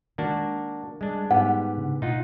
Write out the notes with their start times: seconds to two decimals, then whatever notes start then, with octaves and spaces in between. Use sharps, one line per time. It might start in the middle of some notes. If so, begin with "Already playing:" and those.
0.18 D#3 G#3 A#3 D4 F#4
1.01 G3 G#3 D4
1.31 G#2 B3 G4 F#5
1.77 C#3 D4
2.02 B2 A3 D#4 F4 F#5